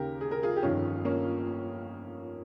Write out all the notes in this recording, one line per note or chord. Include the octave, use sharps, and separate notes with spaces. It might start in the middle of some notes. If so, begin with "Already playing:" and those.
Already playing: D#2 C#3 G4 A#4
G#4
A#4
F4 G#4
G4
G1 F2 D#3 C#4 F4
A#3 C#4